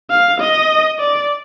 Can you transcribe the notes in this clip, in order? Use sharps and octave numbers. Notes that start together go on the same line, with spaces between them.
F5
D#5
D5